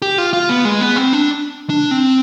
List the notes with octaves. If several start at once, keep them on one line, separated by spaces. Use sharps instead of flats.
G4
F4
F4
B3
G#3
B3
C4
D4
D4
C4